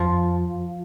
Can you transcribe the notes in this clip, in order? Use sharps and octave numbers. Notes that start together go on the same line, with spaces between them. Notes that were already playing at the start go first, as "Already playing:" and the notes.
Already playing: F2 F3